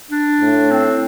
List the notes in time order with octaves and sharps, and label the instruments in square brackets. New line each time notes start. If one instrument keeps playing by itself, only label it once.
[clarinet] D4
[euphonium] A2
[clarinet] C4